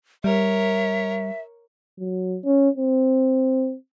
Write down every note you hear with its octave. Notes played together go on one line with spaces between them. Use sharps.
G3 A#4 C#5 E5
F#3
C#4
C4